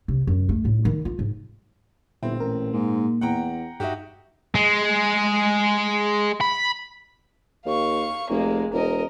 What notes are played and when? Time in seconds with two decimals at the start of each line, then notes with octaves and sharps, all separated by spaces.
0.08 C3
0.27 F#2
0.49 A3
0.65 A2
0.85 D#3
1.05 F4
1.19 G#2
2.23 G1 A#2 C4 E4
2.40 A1 A#4
2.73 G#2 A#3
3.21 E2 F#5 G5 A#5
3.80 G2 D#4 F#4 G4 E5
4.55 G#3
6.41 B5
7.66 D#2 F5 C#6
8.30 F1 G#3 A#3
8.73 E1 A#4 D#5